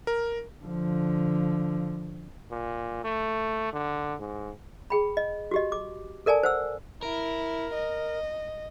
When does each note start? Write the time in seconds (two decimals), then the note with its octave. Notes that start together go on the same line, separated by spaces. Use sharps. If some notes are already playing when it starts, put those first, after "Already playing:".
0.07 A#4
0.64 D3 F3
2.51 A#2
3.04 A3
3.73 D3
4.20 G#2
4.90 G#4 G5 B5
5.17 D#5
5.51 F#4 G4 D#5
5.72 D6
6.26 A4 A#4 D5 G#5 A5
6.43 C5 F#5 E6
7.03 E4 A#4
7.74 D#5